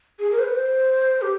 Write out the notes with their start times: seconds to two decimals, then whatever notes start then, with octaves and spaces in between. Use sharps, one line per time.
0.19 G#4
0.32 A#4
0.39 C5
0.43 B4
0.55 C5
1.22 G4